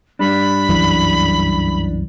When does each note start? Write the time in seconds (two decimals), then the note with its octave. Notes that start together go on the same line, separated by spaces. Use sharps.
0.19 G2 G3 D4 B5
0.69 C2 F#2 E3